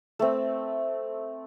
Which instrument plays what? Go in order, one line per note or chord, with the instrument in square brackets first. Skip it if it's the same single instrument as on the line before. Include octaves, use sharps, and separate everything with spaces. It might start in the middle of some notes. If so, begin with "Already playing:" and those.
[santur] A3 C4